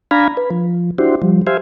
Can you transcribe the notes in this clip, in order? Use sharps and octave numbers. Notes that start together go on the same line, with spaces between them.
D4 F5 G#5 A#5 B5
B4
F3
D4 E4 F#4 G4 C5
F3 G3
G4 C5 E5 F5 G#5